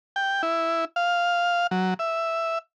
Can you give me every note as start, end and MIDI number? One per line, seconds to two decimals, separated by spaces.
0.16 0.42 79
0.43 0.85 64
0.96 1.67 77
1.71 1.94 54
1.99 2.58 76